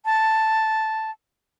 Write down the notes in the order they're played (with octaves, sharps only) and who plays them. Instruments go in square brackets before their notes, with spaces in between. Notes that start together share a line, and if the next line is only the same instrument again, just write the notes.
[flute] A5